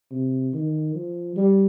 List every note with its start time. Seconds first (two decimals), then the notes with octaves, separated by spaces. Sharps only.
0.11 C3
0.54 D#3
0.95 F3
1.36 G3